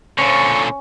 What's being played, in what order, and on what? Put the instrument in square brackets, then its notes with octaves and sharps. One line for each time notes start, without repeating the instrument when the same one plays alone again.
[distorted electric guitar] A#2 D3 [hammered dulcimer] C#4 [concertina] C#6